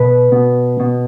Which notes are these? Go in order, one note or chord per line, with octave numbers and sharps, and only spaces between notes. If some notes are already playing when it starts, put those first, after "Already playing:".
Already playing: B2 B4
B2
B2